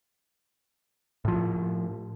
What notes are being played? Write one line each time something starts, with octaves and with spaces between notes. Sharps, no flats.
A2 F3